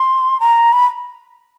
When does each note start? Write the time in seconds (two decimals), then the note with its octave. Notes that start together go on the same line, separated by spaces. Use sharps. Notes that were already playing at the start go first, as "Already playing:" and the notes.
Already playing: C6
0.40 A#5
0.73 B5